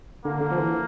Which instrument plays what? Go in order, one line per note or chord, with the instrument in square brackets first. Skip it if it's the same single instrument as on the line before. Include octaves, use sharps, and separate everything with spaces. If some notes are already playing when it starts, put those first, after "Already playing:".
[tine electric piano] D3 [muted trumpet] A#3
[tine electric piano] D3
F3
E3